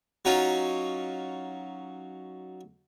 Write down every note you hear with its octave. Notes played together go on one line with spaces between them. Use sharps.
F#3 C#4 D#4 F4